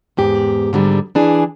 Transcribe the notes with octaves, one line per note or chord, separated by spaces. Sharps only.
E2 G#2 G4
G#2 D3 F#3 G3
E3 D4 G#4